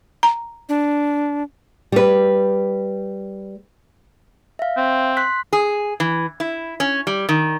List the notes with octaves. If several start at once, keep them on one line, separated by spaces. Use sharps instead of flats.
A#5
D4
G3 B4
E5 F5
C4
C6 F#6 B6
G#4
E3
E4
C#4
G3
D#3